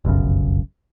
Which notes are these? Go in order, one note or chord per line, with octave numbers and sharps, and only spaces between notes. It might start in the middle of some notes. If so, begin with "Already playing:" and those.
F1 B1 F#2 C#3